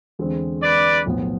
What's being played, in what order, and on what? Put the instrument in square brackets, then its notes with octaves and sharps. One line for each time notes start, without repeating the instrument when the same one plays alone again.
[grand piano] E2 D3 G#3 C4
[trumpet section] B4 D5
[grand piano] B1 A2 F3 B3